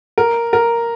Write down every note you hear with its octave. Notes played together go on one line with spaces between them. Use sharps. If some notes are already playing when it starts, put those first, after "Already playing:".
A#4
A#4